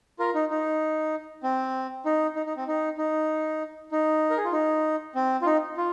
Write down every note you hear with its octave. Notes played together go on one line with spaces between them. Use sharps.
F4 A#4
D#4
D#4
C4
D#4
D#4
D#4
C4
D#4
D#4
D#4
A#4
G#4
F4
D#4
C4
F4
D#4
F4